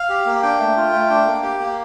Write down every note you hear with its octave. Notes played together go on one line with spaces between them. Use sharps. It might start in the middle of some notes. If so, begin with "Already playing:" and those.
Already playing: F5
G4
A#3
D4 G5
A3
F4
A3
D4
A#3
G4
A#3